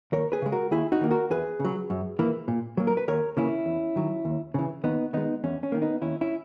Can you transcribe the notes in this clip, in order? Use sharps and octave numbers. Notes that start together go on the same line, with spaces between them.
D#2 A#4 C#5
G#4 B4
C#3 G#3
F#4 A#4
D#2 E4 G#4
D#4 F#4
D#3 A#3
F#4 A#4
E2 G#4 B4
C#3
F#3
F#2
E3 A#3
A#2
F#3 A#3
A#4
B4
D#2 A#4 C#5
C#3 E3 A#3 C#4 E4
E2
D#3 F#3
D#2
C#3 E3
D#2 B3 D#4
D#3 G#3 B3 D#4
E2 C#4
C#4
D#3 A#3
B3 D#4
D#2 C#4 E4
C#4 E4